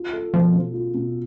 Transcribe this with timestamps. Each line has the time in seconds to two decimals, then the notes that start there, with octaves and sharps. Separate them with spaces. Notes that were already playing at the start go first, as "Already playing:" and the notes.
Already playing: F4
0.13 A4
0.33 B2 F3
0.53 B2
0.73 F4
0.94 B2